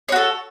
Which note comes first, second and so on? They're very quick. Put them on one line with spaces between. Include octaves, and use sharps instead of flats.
C#5 F#4 A4